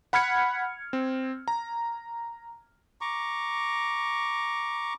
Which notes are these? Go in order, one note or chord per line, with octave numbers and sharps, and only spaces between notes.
F#5 B5 F6 G#6 C#7
C4
A#5
A#5 C#6 D6